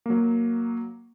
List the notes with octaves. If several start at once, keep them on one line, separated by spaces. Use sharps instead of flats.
F#3 A#3